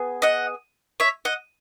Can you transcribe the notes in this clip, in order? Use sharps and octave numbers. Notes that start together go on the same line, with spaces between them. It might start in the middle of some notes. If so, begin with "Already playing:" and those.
Already playing: B3 G#4
D#5 F#5
C#5 E5
D#5 F#5